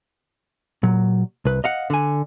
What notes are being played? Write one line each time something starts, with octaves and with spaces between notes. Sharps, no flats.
A#2 F#3
C2 B4
D#5 F5 F#5
D3 G#5